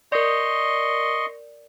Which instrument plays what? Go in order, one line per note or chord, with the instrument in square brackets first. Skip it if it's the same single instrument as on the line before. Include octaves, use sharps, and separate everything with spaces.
[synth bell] A#4 D5 [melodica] D#5 C6 C#6